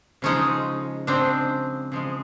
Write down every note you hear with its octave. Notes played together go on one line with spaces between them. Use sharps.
C#3 F3 G#3 C#4 D#4
C#3 F3 G#3 C4 D4
C#3 F3 G#3